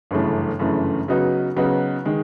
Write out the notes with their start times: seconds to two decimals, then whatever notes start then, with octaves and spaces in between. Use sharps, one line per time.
0.11 G1 F#2 C#3 E3 A3
0.59 G1 F#2 C#3 E3 A3
1.08 C#3 F#3 B3 D#4 F#4
1.56 C#3 F#3 B3 D#4 F#4
2.05 D#3 G#3